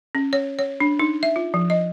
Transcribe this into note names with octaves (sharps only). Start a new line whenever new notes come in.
C#4
C#5
C#5
D4
D#4
E5
F4
F3
D#5